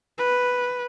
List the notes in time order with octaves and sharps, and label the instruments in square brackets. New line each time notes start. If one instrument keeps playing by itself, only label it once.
[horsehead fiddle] B4